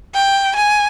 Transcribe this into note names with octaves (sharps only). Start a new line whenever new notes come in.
G5
G#5